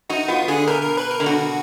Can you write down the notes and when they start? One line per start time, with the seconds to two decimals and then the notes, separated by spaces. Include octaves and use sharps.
0.10 D#4 F#4
0.28 B3 F4
0.48 D3 G#4
0.67 B2 A#4
0.83 A#4
0.97 B4
1.11 A#4
1.20 D3
1.26 B2 F#4